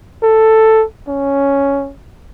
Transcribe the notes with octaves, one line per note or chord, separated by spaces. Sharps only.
A4
C#4